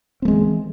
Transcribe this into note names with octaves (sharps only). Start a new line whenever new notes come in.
E3 G#3 A3 C4